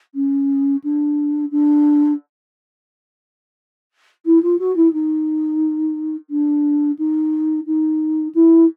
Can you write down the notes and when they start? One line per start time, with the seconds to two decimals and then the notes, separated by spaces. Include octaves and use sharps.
0.15 C#4
0.84 D4
1.51 D4
4.26 E4
4.43 F4
4.59 F#4
4.76 E4
4.93 D#4
6.30 D4
6.99 D#4
7.67 D#4
8.35 E4